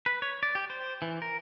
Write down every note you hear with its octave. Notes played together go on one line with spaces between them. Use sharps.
B4
C#5
D5
G4
C5
E3
A#4